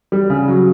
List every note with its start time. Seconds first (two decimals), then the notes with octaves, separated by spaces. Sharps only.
0.12 G3
0.30 C#3
0.48 F#3